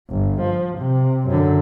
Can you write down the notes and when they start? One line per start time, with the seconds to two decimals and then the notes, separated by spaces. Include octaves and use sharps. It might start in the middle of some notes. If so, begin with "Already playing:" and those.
0.10 G1
0.41 F3
0.78 C3
1.27 F#2 D3